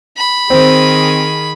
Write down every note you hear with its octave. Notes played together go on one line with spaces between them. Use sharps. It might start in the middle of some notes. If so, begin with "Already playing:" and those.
B5
D#3 C4 G#4